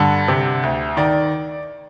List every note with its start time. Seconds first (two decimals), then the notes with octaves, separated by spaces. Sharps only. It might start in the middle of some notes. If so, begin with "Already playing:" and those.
Already playing: G2 D3
0.28 C3
0.63 D2
0.97 D#3 D5